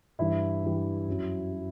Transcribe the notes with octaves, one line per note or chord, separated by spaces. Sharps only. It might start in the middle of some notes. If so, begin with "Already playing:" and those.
G2 E3 G3 E4 E5
G2 E3 G3
F#2 F#3
F#3